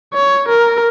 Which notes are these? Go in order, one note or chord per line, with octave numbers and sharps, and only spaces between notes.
C#5
A#4